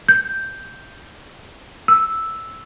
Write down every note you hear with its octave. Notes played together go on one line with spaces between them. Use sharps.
G6
E6